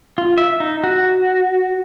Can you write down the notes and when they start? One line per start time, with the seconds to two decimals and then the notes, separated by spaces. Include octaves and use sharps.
0.18 F4
0.38 E5
0.60 D#4
0.84 F#4